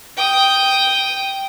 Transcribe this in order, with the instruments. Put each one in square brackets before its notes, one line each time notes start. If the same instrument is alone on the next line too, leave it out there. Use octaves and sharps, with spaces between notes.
[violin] G5 D#6